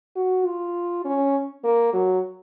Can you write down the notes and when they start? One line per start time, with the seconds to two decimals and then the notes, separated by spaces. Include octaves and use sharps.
0.16 F#4
0.45 F4
1.05 C#4
1.64 A#3
1.93 F#3